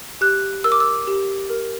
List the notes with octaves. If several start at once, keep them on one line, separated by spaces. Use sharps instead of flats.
G4 F#6
A#4 E6
D6
E6
G4
A#4